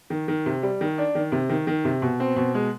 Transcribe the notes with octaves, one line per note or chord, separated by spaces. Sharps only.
D#3
D#3
C3
G3
D#3
D4
D#3
C3
D#3
D#3
C3
B2
C4
B2
G#3